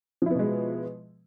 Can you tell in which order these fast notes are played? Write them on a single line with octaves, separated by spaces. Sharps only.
F3 E4 B3 B2 G#3